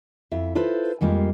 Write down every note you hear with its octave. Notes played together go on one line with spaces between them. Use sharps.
F2 E4 E5
E4 F4 A4 B4 C5
F2 G3 G#3 A#3 F4